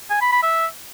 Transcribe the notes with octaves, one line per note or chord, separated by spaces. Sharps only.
G#5
B5
B5
E5